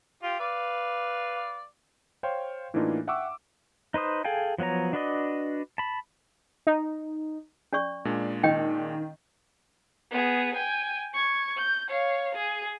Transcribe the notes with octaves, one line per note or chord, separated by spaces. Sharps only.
F4 G4
B4 D5 F5
C5 C#5 F5 G5 C6
A2 E3 A#3 D4 D#4 F4
E5 F#5 G5 C#6 D6 E6
D#4 B4 C5 D#6
G#4 A4 F5 G5 G#5
F3 F#3 B3 C#5 A#5
D4 F#4 B4 D5 D#5
A5 B5
D#4
C#4 D5 C#6
A#2 G#3 D4
D#3 C#4 D#5 G5
B3 G#4
G5 G#5
C#6 G#6
G6
C#5 F5
G#4